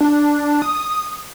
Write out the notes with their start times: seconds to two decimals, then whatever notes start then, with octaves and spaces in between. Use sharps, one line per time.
0.01 D4
0.62 D#6